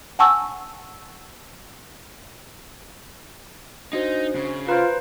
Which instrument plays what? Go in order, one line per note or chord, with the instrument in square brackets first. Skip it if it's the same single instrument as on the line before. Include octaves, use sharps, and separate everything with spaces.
[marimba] F#5 G#5 A5 C#6 E6
[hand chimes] D4 F#4 C5 [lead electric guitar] D#4
[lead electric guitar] C#3
[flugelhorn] F4 [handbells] B4 C5 [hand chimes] A#5 C6